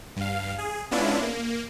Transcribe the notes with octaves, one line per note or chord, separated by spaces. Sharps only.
G2 F5
G#4
G#3 B3 C#4 D4 E4 F4
A#3